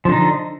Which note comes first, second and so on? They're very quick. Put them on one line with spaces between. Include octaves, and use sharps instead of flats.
F3 D3 D#4